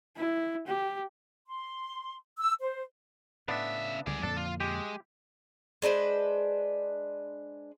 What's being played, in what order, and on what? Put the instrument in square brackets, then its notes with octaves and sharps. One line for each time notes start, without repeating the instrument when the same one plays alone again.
[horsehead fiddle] E4
G4
[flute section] C6
E6
C5
[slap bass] A2 [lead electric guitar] C#3 E5 [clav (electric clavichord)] B3 D4
[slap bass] C#2 D3 G3 [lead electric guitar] G#4 D5
[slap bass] F2 A#2 D3 [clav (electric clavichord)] D4 [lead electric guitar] A4
[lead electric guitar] F4
[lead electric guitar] G#3 [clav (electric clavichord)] G4
[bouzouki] G#3 D4 B4 C5